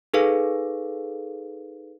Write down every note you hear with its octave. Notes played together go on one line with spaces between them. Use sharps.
D#4 G#4 A4 B4 F5